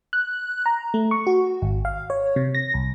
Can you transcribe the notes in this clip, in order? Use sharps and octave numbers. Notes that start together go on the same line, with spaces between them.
F#6
A#5
A3
C#6
F#4
G#1
F5
C#5
C3
A#6
C2